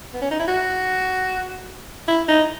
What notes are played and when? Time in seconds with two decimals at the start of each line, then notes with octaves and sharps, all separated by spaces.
0.14 B3
0.22 C#4
0.31 D#4
0.39 E4
0.48 F#4
2.08 E4
2.28 D#4